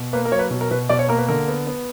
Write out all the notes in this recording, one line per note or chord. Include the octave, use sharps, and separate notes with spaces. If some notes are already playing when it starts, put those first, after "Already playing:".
Already playing: B2
A#3 B4
A#4
F#3 C#5
B4
B2
A#4
B2 B4
B2 D5
C#5
A#3 A#4
B4
D3 A#4
B3
B3